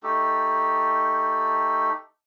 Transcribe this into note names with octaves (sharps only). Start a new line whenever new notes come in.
A3 D#4 G4 A4